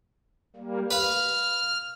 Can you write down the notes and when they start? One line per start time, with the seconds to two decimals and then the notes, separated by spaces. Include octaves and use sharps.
0.56 G3 A#3
0.91 B4 F5 F6